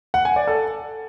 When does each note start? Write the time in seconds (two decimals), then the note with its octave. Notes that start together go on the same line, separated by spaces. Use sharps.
0.14 F#5
0.25 G#5
0.36 D5
0.47 A4